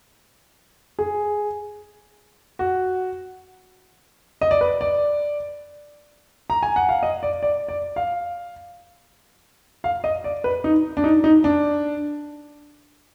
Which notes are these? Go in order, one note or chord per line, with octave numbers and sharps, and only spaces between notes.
G#4
F#4
D#5
D5
B4
D5
A#5
G#5
F#5
F5
D#5
D5
D5
D5
F5
F5
D#5
D5
B4
D#4
D4
D#4
D#4
D4